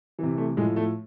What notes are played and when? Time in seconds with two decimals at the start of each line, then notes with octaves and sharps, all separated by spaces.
0.19 C3 E3
0.37 A3
0.57 A2 G#3
0.61 F3
0.76 A3